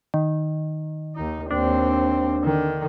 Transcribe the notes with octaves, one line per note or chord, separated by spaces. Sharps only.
D#3
D#2 D#4
D#2 C4 D4
D3 D#3